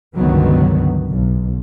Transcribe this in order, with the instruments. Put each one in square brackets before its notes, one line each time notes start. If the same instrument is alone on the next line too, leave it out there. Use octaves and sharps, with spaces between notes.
[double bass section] G1 C#2 D3 D#3 F#3 B3
B1